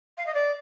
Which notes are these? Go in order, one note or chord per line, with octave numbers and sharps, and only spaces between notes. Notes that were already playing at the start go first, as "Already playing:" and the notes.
F5
D#5
D5